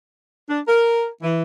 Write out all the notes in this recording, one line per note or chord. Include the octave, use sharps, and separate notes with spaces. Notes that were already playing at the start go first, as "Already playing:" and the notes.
D4
A#4
E3